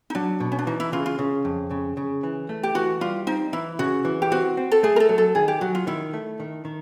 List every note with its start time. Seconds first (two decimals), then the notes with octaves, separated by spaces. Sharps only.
0.10 D#4
0.15 F#3 D4
0.40 B2
0.52 C#4
0.59 D4
0.67 E3 D#4
0.80 E4
0.92 C#3 F4
1.06 F4
1.19 C#3
1.45 F2
1.71 C#3
1.97 C#3
2.23 E3
2.49 A3
2.63 G4
2.75 E3 F#4
3.01 G3 F4
3.27 C4 D#4
3.53 E3 E4
3.79 C#3 F#4
4.05 E3
4.22 G4
4.32 C4 F#4
4.57 C4
4.72 A4
4.83 A3 G#4
4.96 A#4
5.00 A4
5.09 F#3
5.18 A4
5.35 D#3 G#4
5.48 G4
5.61 F#3 F#4
5.75 F4
5.87 D#3 E4
6.13 A3
6.40 D#3
6.65 D#3